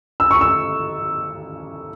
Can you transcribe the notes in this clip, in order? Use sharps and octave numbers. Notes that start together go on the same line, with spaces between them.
E6
C#6
E6